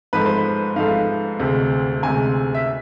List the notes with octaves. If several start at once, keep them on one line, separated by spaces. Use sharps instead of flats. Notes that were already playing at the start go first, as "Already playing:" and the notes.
G#2 F3 A3 B4
C5
B4
G#2 F3 A3 F5
D2 C3 G#3
D2 C3 G#3 G#5
E5